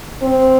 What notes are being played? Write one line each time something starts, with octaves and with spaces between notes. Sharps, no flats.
C4